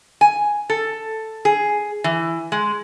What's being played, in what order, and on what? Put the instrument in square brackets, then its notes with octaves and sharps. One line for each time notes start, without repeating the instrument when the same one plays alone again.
[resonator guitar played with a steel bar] G#5
A4
G#4
E3
G#3